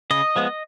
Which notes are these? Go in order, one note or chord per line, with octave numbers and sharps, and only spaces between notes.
C#3 D#5
F3 G#3 B3